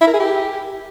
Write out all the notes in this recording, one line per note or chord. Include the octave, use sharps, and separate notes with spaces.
E4
A#4
G#4
G4